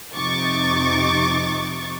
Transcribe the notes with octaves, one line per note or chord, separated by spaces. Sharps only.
F2 C3 D#4 C#6 D6 A6